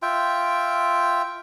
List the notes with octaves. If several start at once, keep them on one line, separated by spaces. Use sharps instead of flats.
F4 E5 G5